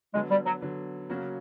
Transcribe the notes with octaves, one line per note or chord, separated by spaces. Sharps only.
D3 F#3 G#3 B3
G3
F#3
D3 F#3 B3
C#3 F#3 A#3 C#4 F#4